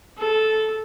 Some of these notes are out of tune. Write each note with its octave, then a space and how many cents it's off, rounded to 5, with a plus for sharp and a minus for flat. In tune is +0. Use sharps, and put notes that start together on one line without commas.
A4 -10